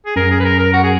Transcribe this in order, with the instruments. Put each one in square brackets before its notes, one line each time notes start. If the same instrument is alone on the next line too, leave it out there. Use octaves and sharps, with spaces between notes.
[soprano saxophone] G#4
[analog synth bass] F#2 [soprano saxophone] A#4
[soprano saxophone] G#4
B4
A#4
A#4
F#4
G#4